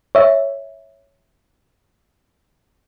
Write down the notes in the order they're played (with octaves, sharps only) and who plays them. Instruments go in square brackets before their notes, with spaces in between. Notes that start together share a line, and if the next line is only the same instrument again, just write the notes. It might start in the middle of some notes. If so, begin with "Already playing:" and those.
[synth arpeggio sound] C#5 E5